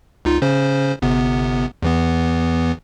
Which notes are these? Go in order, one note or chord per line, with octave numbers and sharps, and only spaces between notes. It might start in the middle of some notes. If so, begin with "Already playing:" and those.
C#2 D#4 F4
C#3 C#4 C5
G1 C3 B3
E2 E3 B3